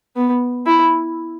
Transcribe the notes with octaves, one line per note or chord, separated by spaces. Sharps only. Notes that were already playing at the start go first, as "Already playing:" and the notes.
B3
E4